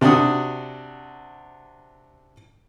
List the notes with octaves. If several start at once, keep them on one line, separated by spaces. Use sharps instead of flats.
C3 D4 F#4 F#5 D#6